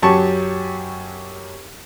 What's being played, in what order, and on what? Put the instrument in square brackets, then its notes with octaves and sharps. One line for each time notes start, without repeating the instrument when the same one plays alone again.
[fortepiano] F#2 F#3 G4 A5 C#6